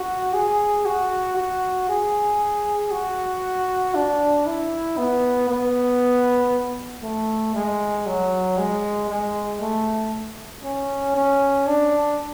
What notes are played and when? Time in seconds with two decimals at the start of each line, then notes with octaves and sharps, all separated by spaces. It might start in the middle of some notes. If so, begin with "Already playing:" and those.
Already playing: F#4
0.34 G#4
0.86 F#4
1.37 F#4
1.89 G#4
2.91 F#4
3.95 D4
4.46 E4
4.97 B3
5.49 B3
7.03 A3
7.54 G#3
8.06 F#3
8.58 G#3
9.09 G#3
9.61 A3
10.64 C#4
11.16 C#4
11.67 D4